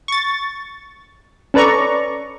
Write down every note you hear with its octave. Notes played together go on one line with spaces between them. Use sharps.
C#6 A6
C#4 A4 B4 D5 A#5 C#6